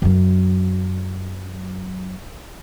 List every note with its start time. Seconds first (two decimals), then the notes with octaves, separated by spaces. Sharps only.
0.02 F#2 F#3